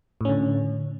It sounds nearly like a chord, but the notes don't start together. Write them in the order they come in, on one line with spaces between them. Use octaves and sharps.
A2 C#4 D3